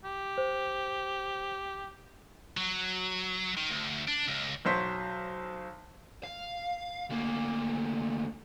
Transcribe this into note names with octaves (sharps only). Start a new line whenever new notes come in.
G4
C5
F#3
D#3
D2
D4
C#2
B1 F#3 C5 B6
F5
D2 A#3